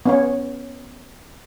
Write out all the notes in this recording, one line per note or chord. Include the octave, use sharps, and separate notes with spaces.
B3 C#4 C#5